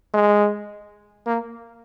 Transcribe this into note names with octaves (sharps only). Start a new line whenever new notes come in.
G#3
A#3